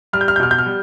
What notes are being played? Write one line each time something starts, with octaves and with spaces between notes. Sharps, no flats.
G3 F6
G6
F6
G6
B2 F6
G6
F6
G3